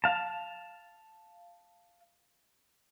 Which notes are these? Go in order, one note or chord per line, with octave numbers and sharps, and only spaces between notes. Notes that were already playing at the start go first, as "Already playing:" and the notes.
F5 A5